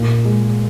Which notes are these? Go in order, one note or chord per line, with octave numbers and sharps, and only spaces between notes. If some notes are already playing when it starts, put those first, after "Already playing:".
Already playing: A#2
G#3